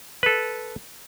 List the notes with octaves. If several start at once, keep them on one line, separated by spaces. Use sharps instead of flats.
A4 B4